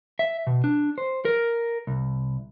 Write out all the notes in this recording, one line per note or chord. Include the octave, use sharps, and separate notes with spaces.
E5
B2
D4
C5
A#4
C2